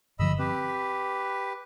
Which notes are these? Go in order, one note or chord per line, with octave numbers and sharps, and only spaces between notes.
G2 D3 F3 D#5 B5 E6
C4 G4 B4